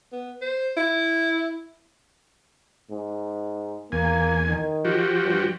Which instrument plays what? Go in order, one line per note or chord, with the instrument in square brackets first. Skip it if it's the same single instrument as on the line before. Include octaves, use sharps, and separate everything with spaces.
[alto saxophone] B3
C5
E4
[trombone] G#2
[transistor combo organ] E2 G#5 [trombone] A#3
[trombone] D#3
[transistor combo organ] F3 F#4 G4
[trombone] G2